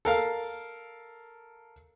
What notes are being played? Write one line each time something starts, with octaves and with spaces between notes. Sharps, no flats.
A4 A#4 F5